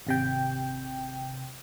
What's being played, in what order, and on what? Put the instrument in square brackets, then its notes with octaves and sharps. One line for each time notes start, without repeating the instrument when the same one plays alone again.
[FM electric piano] G#1 C3 G5